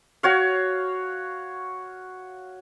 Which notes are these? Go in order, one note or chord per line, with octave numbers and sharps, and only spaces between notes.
F#4 C#5 F5